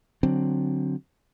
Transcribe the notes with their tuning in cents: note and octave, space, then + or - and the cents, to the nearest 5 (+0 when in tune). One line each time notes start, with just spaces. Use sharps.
D3 +0 F#3 +0 C4 +0